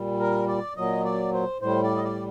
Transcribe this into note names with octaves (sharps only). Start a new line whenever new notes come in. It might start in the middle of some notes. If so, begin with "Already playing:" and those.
Already playing: A#2 G3
A#4
D5
A#2 F#3 D#5
D5
C5
A2 G3 C5
D5
D#5
D5